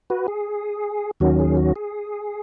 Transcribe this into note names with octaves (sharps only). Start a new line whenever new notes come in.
F#4 B4
G#4
D#2 D#3 F#3 C#4 F#4
G#4
F#4
G#4